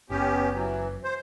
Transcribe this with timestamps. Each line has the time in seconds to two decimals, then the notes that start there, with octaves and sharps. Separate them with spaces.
0.10 F#1 B3 C#4 G4
0.54 E3 F#3
1.04 C5